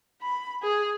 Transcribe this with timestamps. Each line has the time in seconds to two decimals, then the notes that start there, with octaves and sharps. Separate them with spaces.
0.22 B5
0.62 G#4